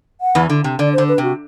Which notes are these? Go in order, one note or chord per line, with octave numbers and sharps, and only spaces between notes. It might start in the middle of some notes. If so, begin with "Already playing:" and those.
F#5
E2 E3
D3
C3
D3 D5
D3 C5
B4
C3 F#4